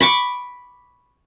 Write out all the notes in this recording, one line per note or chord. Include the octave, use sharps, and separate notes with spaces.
B5 C#6 D6